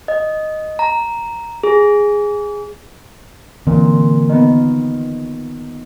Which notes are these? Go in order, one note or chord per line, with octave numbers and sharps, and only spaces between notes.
D#5
A#5
G#4
A#2 D3 E3 C4
D#3 B3